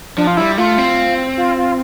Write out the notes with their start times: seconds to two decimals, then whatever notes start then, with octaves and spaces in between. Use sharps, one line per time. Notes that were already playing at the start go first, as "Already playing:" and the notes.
0.17 F3 D4
0.27 F4
0.37 G3 E4
0.58 A3 F4
0.78 C4
1.37 F4
1.58 F4